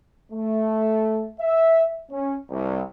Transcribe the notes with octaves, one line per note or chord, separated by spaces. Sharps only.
A3
E5
C#4
C2